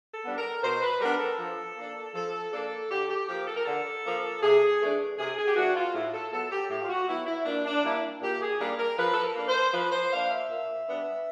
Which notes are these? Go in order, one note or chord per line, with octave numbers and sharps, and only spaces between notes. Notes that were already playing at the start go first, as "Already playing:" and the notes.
A4
G3 B3 D4
A#4
B2 C5
B4
G3 B3 D4 A#4
A4
F3
A#3 D4
F3 A4
A#3 D4 A4
D3 G4
G4
F3 A#3 G4
A4
A#4
D3 A4
F3 A#3
C3 G#4
E3 A3 D4
C3 G#4
G#4
G4
E3 A3 D4 F#4
F4
A2 E4
A4
F#3 B3 A4
G4
A2 G4
F4
F#4
F#3 B3 E4
E4
A#2 D4
D4
G3 A#3 D4 E4
A#2 G4
G#4
G3 A#3 D4 A#4
A#4
F3 B4
A4
A#4
A#3 D4
C5
F3 B4
C5
A#3 D4 F5
E5
A#2
G3 B3 D4